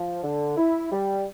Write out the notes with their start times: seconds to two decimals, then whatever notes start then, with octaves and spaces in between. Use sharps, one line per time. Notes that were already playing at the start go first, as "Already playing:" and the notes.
Already playing: F3
0.23 D3
0.57 E4
0.92 G3